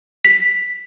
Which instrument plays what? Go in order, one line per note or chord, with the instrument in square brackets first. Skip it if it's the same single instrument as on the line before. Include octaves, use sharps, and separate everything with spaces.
[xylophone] B6